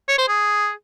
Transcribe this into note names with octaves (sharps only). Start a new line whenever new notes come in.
C#5
C5
G#4